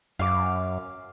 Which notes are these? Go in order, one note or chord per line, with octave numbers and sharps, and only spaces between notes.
F#2 F5 D6